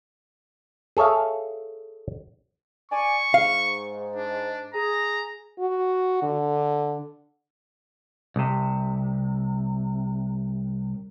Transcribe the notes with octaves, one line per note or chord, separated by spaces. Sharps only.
G#4 A4 C#5 E5 F5
D5 G#5 C#6
G#2 F5
D4
G#4 A#5
F#4
D3
C2 C3